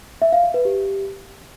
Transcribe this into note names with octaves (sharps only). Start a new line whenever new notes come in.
E5
F5
E5
B4
G4